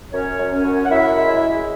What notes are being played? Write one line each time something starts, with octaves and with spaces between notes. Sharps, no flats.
F#2 C#4 C#5
F#2
C#4 C#5
F#2
F#5
F#2 E4 E5
G#3
G#3